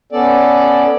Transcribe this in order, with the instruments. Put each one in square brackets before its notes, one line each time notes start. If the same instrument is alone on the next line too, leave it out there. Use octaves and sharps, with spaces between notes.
[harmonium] B3 C#4 A4 D5